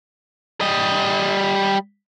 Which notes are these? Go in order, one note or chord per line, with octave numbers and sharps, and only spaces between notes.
G3 D#5